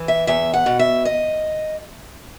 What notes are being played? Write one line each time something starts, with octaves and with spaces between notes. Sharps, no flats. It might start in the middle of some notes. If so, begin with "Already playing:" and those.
Already playing: E3
E5
E2 E5
F#5
B2
E5
D#5